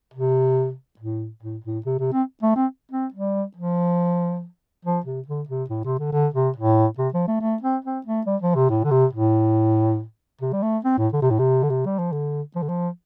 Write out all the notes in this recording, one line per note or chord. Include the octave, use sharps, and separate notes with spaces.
C3
A2
A2
A2
C3
C3
C4
A3
C4
C4
G3
F3
F3
C3
D3
C3
A2
C3
D3
D3
C3
A2
C3
F3
A3
A3
C4
C4
A3
G3
F3
C3
A2
D3
C3
A2
C3
G3
A3
C4
A2
D3
C3
A2
C3
D3
C3
G3
F3
D3
F3
D3
F3